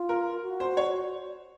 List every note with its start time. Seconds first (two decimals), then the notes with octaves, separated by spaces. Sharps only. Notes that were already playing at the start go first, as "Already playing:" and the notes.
Already playing: F4
0.09 A#4
0.43 F#4
0.60 C5
0.77 C#5